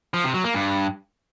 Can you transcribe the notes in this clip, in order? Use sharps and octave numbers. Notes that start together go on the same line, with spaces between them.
F3
C3
F#3
A#3
G2